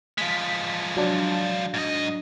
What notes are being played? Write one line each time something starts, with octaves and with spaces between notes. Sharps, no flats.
F3 G#3 B6
F#3 D4
G#2 D#5